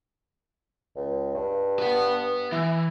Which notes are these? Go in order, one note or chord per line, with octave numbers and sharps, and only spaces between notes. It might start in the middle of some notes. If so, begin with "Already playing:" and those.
C#2
G2
B4 F#5
E3 E4